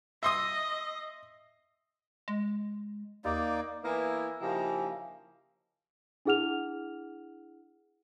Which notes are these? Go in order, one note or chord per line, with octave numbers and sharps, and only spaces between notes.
D#5 E5 C6 D#6
G#3
D#2 A#3 D#4 D5
E3 A#3 B3 E4
C#3 F3 A#3 D#4 E4 G4
D4 E4 G#4 F#5 F6 F7